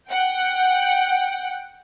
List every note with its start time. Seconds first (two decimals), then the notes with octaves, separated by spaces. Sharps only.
0.11 F#5 G5